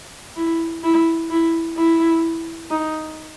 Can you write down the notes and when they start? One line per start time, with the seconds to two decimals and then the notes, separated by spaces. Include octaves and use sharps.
0.36 E4
0.83 E4
1.31 E4
1.77 E4
2.71 D#4